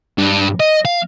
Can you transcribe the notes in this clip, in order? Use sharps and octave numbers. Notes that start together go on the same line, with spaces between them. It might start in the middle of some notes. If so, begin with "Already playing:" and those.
G2
D#5
F5